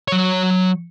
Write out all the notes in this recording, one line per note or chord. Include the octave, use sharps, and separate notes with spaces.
F#3 C#5